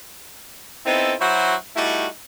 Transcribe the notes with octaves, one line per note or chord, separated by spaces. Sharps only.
B3 C4 D#4 E4 A4
F#3 E4 F#4 C5
G3 A3 D#4 E4 F#4